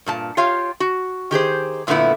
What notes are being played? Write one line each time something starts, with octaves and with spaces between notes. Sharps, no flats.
G2 A#2 A5
F4 G4 C#5 F5
F#4
D#3 G4 G#4 C5
F#2 A#2 D3 A3 B3 E4